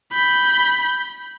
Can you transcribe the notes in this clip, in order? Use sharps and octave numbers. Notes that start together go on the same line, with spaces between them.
B5 G6